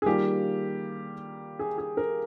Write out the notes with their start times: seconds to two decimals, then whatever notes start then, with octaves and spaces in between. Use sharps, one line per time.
0.02 G#4
0.06 D#3 G3 A#3 F4 G4
1.59 G#4
1.78 G#4
1.97 A#4